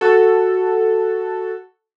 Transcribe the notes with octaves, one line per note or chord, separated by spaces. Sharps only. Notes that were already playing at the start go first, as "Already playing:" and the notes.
F#4 A4